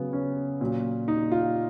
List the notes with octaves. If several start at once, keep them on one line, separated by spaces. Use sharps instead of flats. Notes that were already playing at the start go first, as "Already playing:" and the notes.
Already playing: C#3 F#3 B3
C#4
A#2 F#3
D#4
F4